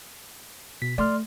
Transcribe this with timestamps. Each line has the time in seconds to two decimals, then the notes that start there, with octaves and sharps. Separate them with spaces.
0.82 B2 B6
0.98 A3 D5 C6 F6